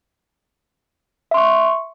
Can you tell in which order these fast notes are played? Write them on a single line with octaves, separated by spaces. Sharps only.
E5 C6 C#6